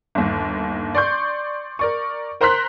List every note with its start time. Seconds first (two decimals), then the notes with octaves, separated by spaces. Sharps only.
0.15 G1 D#2
0.95 D5 C6 C#6 G6
1.79 A#4 D5 C#6
2.41 A#4 C5 A#5 C6 F#6 B6